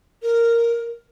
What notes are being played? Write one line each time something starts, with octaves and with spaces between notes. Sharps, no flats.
A#4